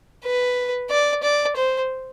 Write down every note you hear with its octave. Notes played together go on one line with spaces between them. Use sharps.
B4
D5
D5
C5